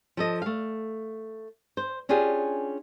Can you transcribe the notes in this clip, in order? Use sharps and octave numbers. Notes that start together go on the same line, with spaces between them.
F3 A4 D#5
A3 F5
C5
C#4 D4 F4 G4 G#4